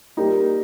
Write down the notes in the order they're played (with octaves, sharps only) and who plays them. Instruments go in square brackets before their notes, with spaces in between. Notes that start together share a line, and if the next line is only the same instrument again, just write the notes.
[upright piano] G3 A#3 D#4 G4